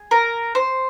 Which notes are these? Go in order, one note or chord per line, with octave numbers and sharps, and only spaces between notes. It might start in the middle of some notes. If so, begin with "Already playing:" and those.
Already playing: G#4
A#4
C5